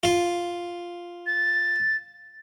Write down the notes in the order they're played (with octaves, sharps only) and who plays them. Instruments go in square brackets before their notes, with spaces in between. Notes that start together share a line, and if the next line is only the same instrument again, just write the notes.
[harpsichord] F4
[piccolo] A6